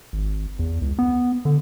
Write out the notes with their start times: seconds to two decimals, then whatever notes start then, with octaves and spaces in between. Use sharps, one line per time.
0.13 G#1
0.59 E2
0.82 C#2
0.99 B3
1.45 D3